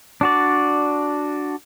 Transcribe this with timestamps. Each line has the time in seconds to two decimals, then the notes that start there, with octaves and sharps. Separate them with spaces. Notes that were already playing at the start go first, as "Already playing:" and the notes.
0.21 D4 F#4 D5